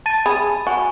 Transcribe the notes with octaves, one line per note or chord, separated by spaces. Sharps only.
A5 A6 D#7
G#4 B5
F#4 G#5